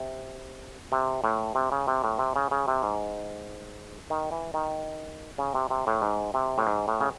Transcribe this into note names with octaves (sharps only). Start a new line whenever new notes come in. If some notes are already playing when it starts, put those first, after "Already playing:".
Already playing: C3
C3
A2
C3
C#3
C3
A2
C3
C#3
C#3
C3
G#2
D#3
E3
D#3
C#3
C3
C3
A2
G#2
C3
A2
G#2
A2
C#3